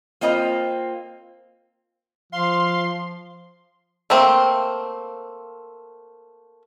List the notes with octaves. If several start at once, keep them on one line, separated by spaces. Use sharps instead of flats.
A#3 C4 F4 D#5 A#5
F3 F5 C6
A3 A#3 C4